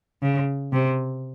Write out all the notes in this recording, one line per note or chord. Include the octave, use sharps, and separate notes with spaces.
C#3
C3